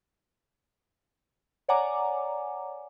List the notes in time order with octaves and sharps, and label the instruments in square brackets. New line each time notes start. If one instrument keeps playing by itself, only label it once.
[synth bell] C#5 D5 F#5 G#5 A#5 D6